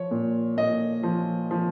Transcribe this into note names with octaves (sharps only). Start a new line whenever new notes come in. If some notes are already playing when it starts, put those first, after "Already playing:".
Already playing: F3 C#5
A#2
A#2 D#5
F3
F3